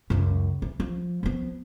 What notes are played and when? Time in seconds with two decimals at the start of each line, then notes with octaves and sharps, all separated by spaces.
0.10 C#2 F#2
0.62 E3
0.80 F3
1.23 F3 B3